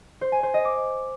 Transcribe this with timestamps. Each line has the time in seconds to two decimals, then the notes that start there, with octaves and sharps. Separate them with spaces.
0.21 C5
0.32 G#5
0.43 C5
0.54 D#5
0.65 D6